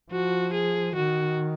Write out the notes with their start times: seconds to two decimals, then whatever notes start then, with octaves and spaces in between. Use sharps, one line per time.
0.12 F3 F#4
0.54 G#4
0.96 D#3 F#4